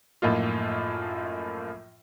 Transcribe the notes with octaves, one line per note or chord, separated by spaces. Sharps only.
F#2 A2 F3 A#3 D#4 F4